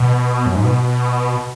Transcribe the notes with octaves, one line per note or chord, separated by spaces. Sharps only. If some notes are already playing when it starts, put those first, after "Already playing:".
Already playing: B2
F#2
G#2
B2